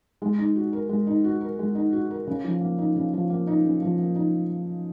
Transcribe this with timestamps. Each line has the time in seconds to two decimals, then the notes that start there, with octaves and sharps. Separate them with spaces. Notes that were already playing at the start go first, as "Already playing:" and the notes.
0.22 G#3
0.39 D#4
0.56 F#4
0.73 A#4
0.89 G#3
1.07 D#4
1.24 F#4
1.41 A#4
1.59 G#3
1.75 D#4
1.93 F#4
2.11 A#4
2.27 C#3
2.44 F3
2.61 A#3
2.78 D#4
2.96 C#3
3.14 F3
3.30 A#3
3.47 D#4
3.65 C#3
3.82 F3
3.99 A#3
4.16 D#4